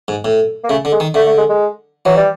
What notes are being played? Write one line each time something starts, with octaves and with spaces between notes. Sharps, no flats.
G#2
A2
A#3
C#3 A3
D3
G#3
D#3
D3 A3
A3
G#3
G#3
E3 F#3
G3